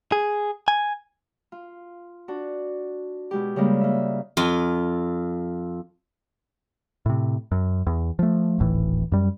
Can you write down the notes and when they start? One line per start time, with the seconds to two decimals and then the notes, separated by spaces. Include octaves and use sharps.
0.12 G#4
0.68 G#5
1.52 F4
2.28 D4 F#4
3.31 B2 G#3 G4
3.56 C#3 G3 G#3 A#3
3.81 A#3 E5
4.37 F2 F4
7.06 A2 C3
7.52 F#2
7.87 E2
8.19 F3 A3
8.59 D1 G#1 A2 E3
9.12 F#2 G3